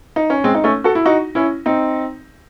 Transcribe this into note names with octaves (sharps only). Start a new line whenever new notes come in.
D#4
C#4
G#3 C4
D#4
A3 C#4
F#4 A4
E4
D#4 F#4
C#4 E4
C4 D#4